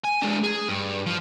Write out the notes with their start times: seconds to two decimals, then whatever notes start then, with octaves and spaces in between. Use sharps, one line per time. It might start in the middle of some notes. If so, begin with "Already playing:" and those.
0.04 G#5
0.22 G#3 D4
0.43 G#4
0.69 G2
1.06 F3